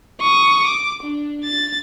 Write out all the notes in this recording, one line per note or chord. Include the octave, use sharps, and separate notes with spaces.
C#6 D#6
D6
D4
A6